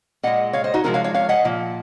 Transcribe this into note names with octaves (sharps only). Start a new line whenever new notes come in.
A#2 G#3 D#5 F#5
C#5 F5
C5 D#5
D#4 F#4
C3 F3 G#3 F#4 A#4
C#5 F5
C#5 F5
C#5 F5
D#5 F#5
A#2 F3